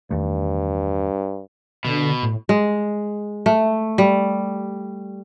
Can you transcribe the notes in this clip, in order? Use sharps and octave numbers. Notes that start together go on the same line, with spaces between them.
E2 G2 D#3 A3
B2 D3
A2
G#3
A3
G3